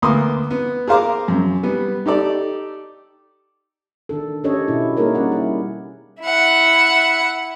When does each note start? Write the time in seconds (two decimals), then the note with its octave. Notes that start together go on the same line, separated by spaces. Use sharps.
0.02 D2 A#3 B3 C6 D6 D#6
0.51 B3
0.88 G#4 A#4 C5 F5 A#5 D6
1.28 F#2
1.63 G3 B3
2.06 D#4 G4 A4 D5
4.09 D#3 D4 A4
4.44 C#4 D4 G4 A4 C#5 D#5
4.67 B2 E4 F#4
4.97 G3 A#3 D#4 G#4 A#4 C#5
5.15 C#4 D5 F#5
5.32 G3 E4
6.21 E4 F#5